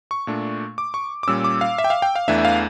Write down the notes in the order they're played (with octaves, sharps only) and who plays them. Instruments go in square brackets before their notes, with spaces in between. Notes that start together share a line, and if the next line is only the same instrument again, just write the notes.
[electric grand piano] C#6
A#2 A3 D4
D6
C#6
D6
A#2 G3 C#4 E6
D6
F5
E5
G5
F5
G5
F5
E2 E3 A3 D4 E5
E5
F5